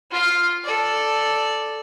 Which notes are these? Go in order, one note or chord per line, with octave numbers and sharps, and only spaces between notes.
F4 F5
A4 D5